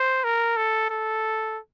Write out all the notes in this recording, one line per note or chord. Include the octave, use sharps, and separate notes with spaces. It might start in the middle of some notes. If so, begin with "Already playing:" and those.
Already playing: C5
A#4
A4
A4